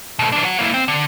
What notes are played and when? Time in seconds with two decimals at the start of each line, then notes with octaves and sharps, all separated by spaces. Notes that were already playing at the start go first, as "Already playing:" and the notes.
0.19 B2 A3
0.32 E3 D4
0.44 C#5 F#5
0.59 A#3 E4
0.74 C4
0.88 D3